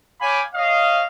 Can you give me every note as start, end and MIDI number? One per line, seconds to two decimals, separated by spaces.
0.21 0.42 73
0.21 0.42 77
0.21 0.42 79
0.21 0.42 80
0.21 0.42 83
0.21 0.42 86
0.55 1.05 73
0.55 1.05 75
0.55 1.05 77